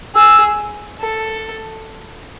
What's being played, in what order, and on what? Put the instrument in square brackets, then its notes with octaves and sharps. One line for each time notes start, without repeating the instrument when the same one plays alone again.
[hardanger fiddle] G#4 [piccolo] E6
[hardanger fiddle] A4